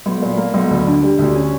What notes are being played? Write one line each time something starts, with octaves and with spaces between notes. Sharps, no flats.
B1
A#2
A#3
B1
D2
D3
G3
D2
C#4